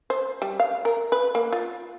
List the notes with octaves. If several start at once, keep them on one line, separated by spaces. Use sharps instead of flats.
C5
G3
F5
A#4
B4
A#3
F4